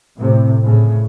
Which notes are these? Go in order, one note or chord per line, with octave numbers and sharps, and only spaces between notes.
A2 C3
A2 C#3